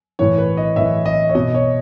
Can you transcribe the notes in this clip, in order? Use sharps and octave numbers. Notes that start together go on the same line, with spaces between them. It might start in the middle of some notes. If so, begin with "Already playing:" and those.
A2 E3 C#5
B4
D#5
A2 E3 E5
D#5
C#5
B2 D#5
C#5